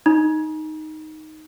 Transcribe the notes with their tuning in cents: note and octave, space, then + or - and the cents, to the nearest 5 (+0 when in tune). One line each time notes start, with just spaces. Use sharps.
D#4 +0 A#5 +45